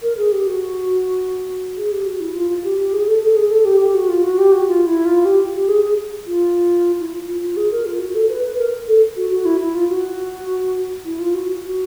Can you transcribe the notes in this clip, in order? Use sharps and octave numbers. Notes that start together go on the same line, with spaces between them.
A#4
G#4
G4
F#4
G#4
G4
F#4
E4
F4
F4
G4
G4
G#4
A4
A4
G#4
A4
G4
G4
F#4
F4
F#4
G4
F#4
F4
E4
F4
G4
G4
G#4
G#4
F4
E4
F4
F4
G#4
A#4
F4
F#4
A4
B4
B4
A#4
A4
F#4
F#4
E4
E4
F4
F#4
E4
F4
F#4
F#4